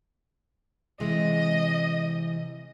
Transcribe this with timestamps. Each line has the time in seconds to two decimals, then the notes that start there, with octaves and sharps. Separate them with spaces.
1.00 C3 E3 G#3 D#5